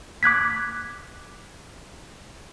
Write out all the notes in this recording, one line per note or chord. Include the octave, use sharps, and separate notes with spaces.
D6 F#6 G#6 B6